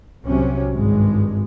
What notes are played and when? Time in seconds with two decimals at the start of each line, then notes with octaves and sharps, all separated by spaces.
0.23 C2 C3 F#3 C#4
0.73 G#1 G2 G#3